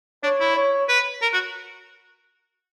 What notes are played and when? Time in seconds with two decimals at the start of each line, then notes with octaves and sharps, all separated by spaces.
0.23 D4 C#5
0.40 E4
0.56 C#5
0.89 B4
1.22 A#4
1.33 F#4